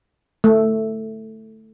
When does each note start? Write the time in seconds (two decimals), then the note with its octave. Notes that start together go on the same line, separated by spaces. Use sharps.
0.44 A3